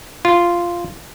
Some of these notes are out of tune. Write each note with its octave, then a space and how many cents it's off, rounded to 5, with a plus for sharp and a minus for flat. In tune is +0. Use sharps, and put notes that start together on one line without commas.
F4 -10